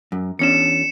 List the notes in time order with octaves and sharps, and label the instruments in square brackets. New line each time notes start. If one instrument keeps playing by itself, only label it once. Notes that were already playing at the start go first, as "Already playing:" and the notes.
[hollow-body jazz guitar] F#2
[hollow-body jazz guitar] E2 C#4 D4 [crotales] C#7 E7